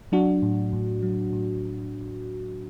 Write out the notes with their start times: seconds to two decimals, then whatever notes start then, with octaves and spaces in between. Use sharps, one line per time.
0.12 F#3 D4 F#4
0.42 A2
0.73 A2
1.03 F#3
1.33 A2